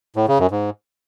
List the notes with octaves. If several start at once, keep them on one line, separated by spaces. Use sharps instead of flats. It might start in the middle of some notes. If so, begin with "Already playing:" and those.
A2
C#3
F#2
G#2